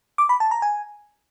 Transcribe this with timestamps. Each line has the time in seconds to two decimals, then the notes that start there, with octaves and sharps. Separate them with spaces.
0.18 D6
0.29 B5
0.40 A5
0.51 A#5
0.62 G#5